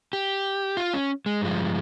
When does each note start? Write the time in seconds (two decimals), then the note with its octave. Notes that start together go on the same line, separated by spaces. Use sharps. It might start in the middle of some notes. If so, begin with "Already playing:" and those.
0.13 G4
0.77 F4
0.94 C#4
1.26 G#3
1.41 G2 F3